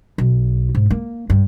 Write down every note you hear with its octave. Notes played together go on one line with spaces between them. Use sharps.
B1
G#2
A#3
G2